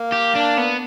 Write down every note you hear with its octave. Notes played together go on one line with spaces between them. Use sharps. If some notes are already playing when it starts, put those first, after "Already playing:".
Already playing: A#3
G4
D4
B3